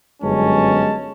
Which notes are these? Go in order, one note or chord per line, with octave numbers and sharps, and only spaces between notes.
G1 F#2 G#3 C#4 A5